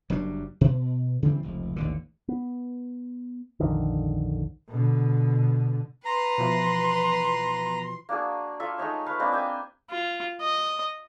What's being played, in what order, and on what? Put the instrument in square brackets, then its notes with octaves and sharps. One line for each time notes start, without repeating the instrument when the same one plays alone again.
[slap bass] F#1 F#3 G3 D4
B2
C#3 E3 G3 C4
F1 C#2
A1 D#2 D3
[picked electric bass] B3
A#1 F2 D3 D#3
[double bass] B2 D3
[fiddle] B4 [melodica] A#5 [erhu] C6
[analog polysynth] B2 E3 F3
[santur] A#3 D4 F#4 G#4
F4 A4 E5
G#3 A3 D#4 C#5
B4 F5 C#6
G#3 A#3 C4 D4
E5 G5 G#5
[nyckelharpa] F4
D#5